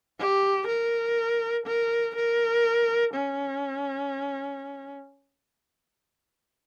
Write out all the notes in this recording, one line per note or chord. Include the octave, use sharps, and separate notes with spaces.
G4
A#4
A#4
A#4
C#4